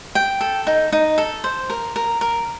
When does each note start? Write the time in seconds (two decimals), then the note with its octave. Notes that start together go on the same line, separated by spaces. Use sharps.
0.15 G5
0.41 A4
0.67 D#4
0.92 D#4
1.18 A4
1.44 C5
1.70 A#4
1.96 A#4
2.21 A#4